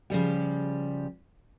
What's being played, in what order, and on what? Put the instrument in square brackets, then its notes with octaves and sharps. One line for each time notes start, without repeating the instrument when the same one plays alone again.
[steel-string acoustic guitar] C#3 F3 G3 G4